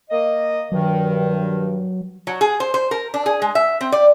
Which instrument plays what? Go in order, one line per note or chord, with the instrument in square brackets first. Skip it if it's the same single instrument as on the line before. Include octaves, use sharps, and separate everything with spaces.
[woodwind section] A#3 D#5
[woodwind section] G2 D#3 [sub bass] F#3
[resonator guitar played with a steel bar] F#3
G#4
C5
C5
A#4
D4
G#4
G#3
E5
C4
D5